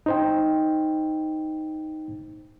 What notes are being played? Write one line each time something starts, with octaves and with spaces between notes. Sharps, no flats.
D#4 C5 G5